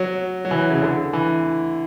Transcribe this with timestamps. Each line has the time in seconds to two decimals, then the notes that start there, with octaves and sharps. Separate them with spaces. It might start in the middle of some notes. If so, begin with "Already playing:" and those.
Already playing: F#3
0.45 F#3
0.51 E3
0.71 C#3
0.82 D3
1.13 E3